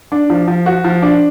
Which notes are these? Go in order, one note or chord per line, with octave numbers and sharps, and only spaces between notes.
D4
F3
F3
F#4
F3
D4